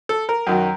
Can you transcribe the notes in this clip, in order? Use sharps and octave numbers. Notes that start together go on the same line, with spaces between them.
A4
A#4
F#2 D#3 F#3